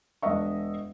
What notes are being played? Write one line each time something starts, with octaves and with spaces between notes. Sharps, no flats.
E1 D4 D#5 E5 C#6